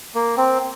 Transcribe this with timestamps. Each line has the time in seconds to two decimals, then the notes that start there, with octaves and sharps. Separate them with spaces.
0.15 A#3
0.37 C4